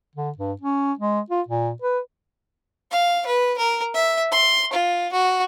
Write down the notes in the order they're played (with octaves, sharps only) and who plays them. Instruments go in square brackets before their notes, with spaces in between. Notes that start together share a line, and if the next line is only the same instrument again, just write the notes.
[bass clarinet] D3
G2
C#4
G#3
F4
A#2
B4
[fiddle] F5
B4
A#4
E5
C6
F4
F#4